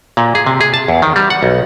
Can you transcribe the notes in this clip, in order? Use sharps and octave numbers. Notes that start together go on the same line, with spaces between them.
A#2
G#4
C3
G#4
A5
E2
D#3
G3
F#5
B1